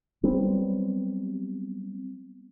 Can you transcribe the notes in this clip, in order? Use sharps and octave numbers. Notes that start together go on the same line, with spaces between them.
F#3 G3 B3 C4